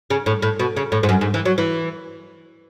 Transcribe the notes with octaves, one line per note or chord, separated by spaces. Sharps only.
C#3
A2
A2
B2
C#3
A2
G#2
F#2
G#2
E3
F#3
E3